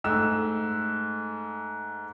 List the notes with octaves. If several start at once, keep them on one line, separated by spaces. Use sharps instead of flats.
G#2 A3 E6 E7